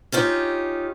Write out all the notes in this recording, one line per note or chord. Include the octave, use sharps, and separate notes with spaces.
C#4 D#4 F4 G4